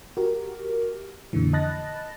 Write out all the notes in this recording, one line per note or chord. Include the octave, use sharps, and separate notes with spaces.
F#4 G4 A#4
F2 A#2 D3 E3
D#5 A5 B5 F#6 A6 A#6